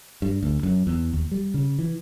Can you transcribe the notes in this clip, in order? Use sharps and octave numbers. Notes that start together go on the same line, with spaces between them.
G2
D2
F#2
E2
D#2
G3
C#3
E3